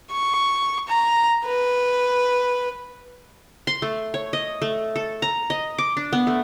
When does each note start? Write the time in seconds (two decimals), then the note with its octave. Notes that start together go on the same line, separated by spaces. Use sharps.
0.12 C#6
0.88 A#5
1.46 B4
3.67 C6
3.82 A3
4.14 C#5
4.33 D#5
4.62 A3
4.96 A4
5.22 A#5
5.50 D#5
5.78 D6
5.97 D4
6.13 B3
6.27 A3